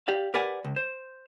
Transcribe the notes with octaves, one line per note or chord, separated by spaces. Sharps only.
G4 D5 F5
G4 A#4 B4 D5 F#5 G#5
C#2
C5